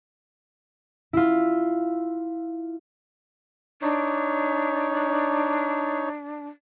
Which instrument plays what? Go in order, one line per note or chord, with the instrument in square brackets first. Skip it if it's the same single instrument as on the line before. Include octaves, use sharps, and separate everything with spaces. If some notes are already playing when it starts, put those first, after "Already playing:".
[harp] E4 F4
[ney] D4 [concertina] D#4 C#5